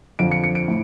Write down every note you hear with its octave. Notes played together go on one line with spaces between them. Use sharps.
F2 D3 F3 D7
C#7
C#7
D7
A2